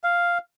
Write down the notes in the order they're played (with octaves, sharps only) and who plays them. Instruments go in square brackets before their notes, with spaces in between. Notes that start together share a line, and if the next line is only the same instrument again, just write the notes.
[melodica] F5